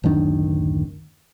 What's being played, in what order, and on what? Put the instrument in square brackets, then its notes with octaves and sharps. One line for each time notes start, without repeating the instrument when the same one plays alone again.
[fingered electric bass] D1 F#2 D#3 D4